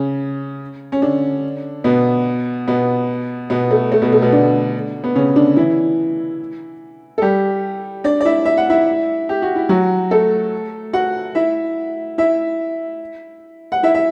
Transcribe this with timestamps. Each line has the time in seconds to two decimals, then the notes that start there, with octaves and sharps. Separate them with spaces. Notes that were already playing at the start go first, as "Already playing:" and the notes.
Already playing: C#3 C#4
0.92 C#4
1.02 D3 D4
1.84 B2 B3
2.68 B2 B3
3.50 B2 B3
3.71 A3
3.92 A3
4.02 B2 B3
4.12 A3
4.22 B2 B3
4.32 D3 D4
5.04 B3
5.15 C#3 C#4
5.36 D3 D4
5.56 E3 E4
7.18 A4
7.22 G3 G4
8.04 D4 D5
8.21 D5
8.25 E4 E5
8.45 E5
8.57 F#5
8.70 E4 E5
9.29 G4
9.42 F#4
9.56 E4
9.69 F#3 F#4
10.11 A3 A4
10.93 F#4 F#5
11.35 E4 E5
12.18 E4 E5
13.72 F#5
13.83 E4 E5
13.95 E5